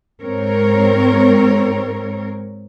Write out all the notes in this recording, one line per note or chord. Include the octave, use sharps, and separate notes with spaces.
G#2 C4 A#4 C#5